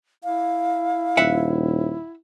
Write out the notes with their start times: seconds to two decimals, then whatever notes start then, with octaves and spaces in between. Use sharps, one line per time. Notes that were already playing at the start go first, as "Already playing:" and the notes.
0.24 E4 F5
1.17 D#1 E5 F#5